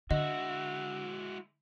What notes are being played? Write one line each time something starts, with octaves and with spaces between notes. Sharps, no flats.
D3 G#3 E4 F#4 D#5